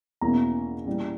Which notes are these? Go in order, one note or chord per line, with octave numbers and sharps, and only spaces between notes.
E2 B2 A#3 C#4 E4 A#5
A#2 G3 C#4 E4